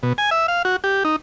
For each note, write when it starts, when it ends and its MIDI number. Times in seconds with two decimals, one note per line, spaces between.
0.03 0.13 47
0.18 0.30 80
0.31 0.47 76
0.48 0.62 77
0.65 0.76 66
0.84 1.03 67
1.05 1.16 63